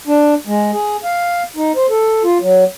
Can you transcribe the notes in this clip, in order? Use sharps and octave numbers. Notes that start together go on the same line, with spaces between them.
D4
G#3
G#4
F5
D#4
C5
A4
F4
F#3